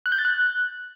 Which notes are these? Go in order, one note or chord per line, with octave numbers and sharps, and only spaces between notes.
F#6
G6
A6
F#6